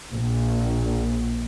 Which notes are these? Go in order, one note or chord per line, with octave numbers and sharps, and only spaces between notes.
A#1